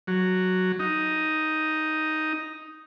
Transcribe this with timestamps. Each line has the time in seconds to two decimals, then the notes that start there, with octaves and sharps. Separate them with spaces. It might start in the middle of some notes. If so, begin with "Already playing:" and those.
0.07 F#3
0.80 D#4